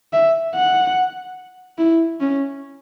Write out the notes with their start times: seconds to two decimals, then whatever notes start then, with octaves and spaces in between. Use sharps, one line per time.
0.13 E5
0.55 F#5
1.78 E4
2.20 C#4